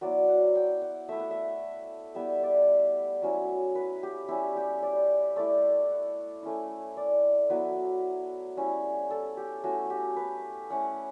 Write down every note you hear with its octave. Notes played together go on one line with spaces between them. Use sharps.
F#3 B3 E4 D5
F#5
G5
F#5
A3 E4 E5
F#5
E5
G3 B3 E4 E5
D5
F#3 C#4 E4
B4
G4
G3 C#4 E4 G4
G4
D5
A3 E4 D5
F#5
A3 C#4 E4
D5
F#3 B3 E4 B4
G3 C#4 E4
A4
G4
A3 C#4 E4 F#4
G4
B4
A3 C#4 E4 F#5